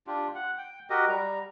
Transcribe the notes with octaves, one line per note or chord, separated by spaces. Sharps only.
D4 F4 G4
F#5
G5
F#4 G4 A#4 D#5
G3 A#5